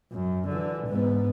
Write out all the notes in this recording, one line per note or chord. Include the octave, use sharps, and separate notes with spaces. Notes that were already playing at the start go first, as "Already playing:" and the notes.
F#2
D3 E3
G#2 B3